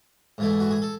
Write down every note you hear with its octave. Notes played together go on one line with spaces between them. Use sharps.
G#2 E3 A3 E4
F#4
G#4
A4